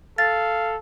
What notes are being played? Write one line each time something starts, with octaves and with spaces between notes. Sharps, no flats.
A4 F5 A6